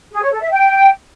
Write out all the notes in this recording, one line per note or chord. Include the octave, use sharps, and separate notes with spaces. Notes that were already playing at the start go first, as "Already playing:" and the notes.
G#4
C#5
A4
E5
G5